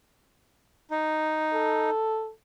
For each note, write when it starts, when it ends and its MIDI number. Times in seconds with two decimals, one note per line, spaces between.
0.91 1.90 63
1.53 2.30 69